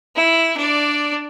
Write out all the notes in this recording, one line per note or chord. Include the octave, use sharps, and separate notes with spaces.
E4
D4 D5